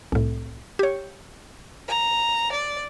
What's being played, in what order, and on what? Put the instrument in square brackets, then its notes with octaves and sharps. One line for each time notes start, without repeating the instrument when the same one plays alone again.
[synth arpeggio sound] C2 A2
G4 C#5
[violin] A#5
D5